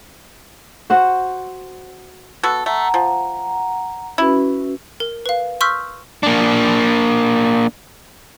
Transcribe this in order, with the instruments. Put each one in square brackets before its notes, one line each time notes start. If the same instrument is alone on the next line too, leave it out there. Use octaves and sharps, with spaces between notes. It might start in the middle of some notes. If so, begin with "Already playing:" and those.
[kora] F#4 C5 F#5
[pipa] B3 F#4 A4 [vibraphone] E6
[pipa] A3 [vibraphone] F#5 A#5
[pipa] F3
[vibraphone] C#4 F#4 B4 [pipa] E4
[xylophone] A#4
B4 F5
C6 C#6 E6 F6 G6 B6
[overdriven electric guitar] A#3 D4